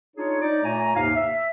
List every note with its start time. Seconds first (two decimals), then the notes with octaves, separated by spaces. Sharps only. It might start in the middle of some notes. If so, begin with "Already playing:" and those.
0.17 D4 D#4 F4 G#4 C#5
0.42 D#4 D5
0.63 A#2 A3 C#5 G#5 A#5
0.96 D#2 G#2 C3 F5
1.16 E5